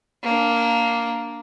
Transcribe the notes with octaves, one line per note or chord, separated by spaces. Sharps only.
A#3 D4